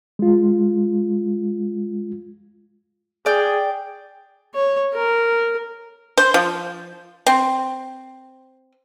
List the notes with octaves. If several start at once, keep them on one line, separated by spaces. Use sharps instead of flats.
G#3 F4
G#4 D5 G5 F6
C#5
A#4
C5
F3
C4